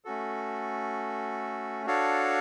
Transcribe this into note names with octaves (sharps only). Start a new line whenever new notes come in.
A3 C#4 F#4 A4
D4 F#4 A4 C#5 F5